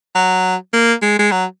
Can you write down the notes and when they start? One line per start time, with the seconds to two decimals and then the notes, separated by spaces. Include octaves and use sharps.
0.15 F#3
0.74 A#3
1.02 G#3
1.19 G#3
1.32 F#3